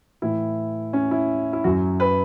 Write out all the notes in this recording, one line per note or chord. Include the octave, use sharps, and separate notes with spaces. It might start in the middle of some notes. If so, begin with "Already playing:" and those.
A2 E3 E4
C#4
E4
E4
F#2 F#3 F#4
B4